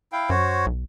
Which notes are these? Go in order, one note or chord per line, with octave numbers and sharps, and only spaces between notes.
E4 F5 G5
F#2 F#4 C5 C#5
B1